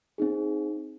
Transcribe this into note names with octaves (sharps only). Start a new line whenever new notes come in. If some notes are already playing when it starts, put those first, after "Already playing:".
C4 D#4 G#4